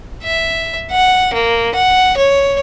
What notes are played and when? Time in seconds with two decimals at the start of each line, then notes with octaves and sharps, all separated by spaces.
0.23 E5
0.92 F#5
1.34 A#3
1.75 F#5
2.17 C#5